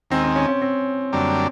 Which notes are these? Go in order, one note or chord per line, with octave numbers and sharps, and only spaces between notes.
D#2 D#3 G#3 C4
C4
C#4
C#4
C4
F#2 D3 G3 A#3 D4